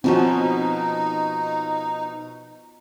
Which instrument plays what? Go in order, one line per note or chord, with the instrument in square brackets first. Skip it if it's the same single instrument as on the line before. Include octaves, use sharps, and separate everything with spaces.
[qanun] B2 F3 C#4 [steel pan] C4 F#4 [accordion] D#4